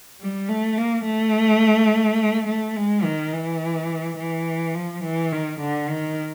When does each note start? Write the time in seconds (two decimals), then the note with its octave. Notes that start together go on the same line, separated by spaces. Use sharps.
0.21 G3
0.49 A3
0.78 A#3
1.06 A3
2.48 A3
2.76 G#3
3.04 D#3
3.33 E3
4.18 E3
4.75 F3
5.04 E3
5.32 D#3
5.61 D3
5.89 D#3